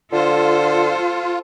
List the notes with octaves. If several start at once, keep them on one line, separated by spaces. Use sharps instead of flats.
D3 F4 A4 C5